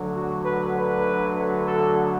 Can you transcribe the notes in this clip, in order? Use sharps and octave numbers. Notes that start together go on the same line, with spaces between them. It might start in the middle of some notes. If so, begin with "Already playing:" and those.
Already playing: D2 D3 F#3
F#4
B4
B4
A4